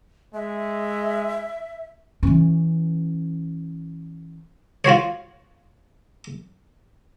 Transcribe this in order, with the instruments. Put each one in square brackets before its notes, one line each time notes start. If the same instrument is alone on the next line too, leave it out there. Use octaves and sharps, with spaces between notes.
[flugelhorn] G#3 [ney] E5
[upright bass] E3 C#4
[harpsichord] F4 F#4 C5 C#5